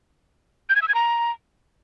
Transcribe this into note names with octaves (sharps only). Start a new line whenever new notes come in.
G6
G#6
E6
G#6
A#5